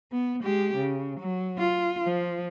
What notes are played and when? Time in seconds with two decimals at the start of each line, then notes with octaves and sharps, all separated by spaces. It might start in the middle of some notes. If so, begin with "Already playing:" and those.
0.12 B3
0.43 G#3 G4
0.76 C#3
1.20 F#3
1.59 F4
2.04 F3